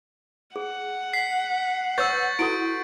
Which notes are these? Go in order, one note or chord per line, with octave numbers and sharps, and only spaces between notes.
G#4 F#5
B6 C7
B4 C#5 C#6 E6 G6 A6
E4 F#4 A4 D7